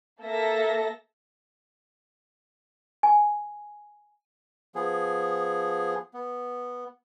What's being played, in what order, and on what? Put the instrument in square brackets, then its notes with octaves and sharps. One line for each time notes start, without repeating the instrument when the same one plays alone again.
[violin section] A#3 A4 E5 A#6
[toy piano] G#5
[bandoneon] F3 B3 G#4
B3